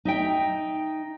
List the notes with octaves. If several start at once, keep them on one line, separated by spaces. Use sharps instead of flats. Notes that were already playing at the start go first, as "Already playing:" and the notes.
D#4 E5 G5